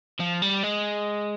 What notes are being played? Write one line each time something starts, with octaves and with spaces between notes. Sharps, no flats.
F3
G3
G#3